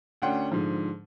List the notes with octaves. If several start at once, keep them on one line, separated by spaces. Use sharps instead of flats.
D2 C#4 D4 F#5 G5 C6
G#2 D3 F3